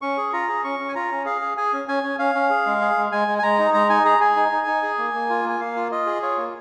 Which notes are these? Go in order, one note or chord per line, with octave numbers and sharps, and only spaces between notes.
C#4 C#6
G#4
F4 A#5
G#4
C#4 C#6
C#4
G#5
F4 A#5
C#4
G#4 F5
G#4
G#4 G#5
C#4
C#4 G#5
C#4
C#4 F5
C#4
G#4
G#3
G#4
G#3
G#3 G#5
G#3
G#5
G#3 A#5
D#4
G#3 A#5
D#4 G#5
G#4 A#5
G#4 G#5
D#4
D#4
D#4
G#4
A#3
A#3
F4
A#3 G#5
A#3 F5
F4
F4 D#5
G#4
F4 C#5
A#3